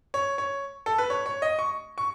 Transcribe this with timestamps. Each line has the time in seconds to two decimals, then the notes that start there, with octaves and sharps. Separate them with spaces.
0.14 C#5
0.38 C#5
0.86 A4
0.98 B4
1.10 C#5
1.26 C#5
1.42 D#5
1.59 C#6
1.98 C#6